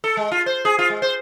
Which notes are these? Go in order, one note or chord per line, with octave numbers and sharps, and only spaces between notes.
A4
G#3
F4
C5
G#4
F4
G#3
C5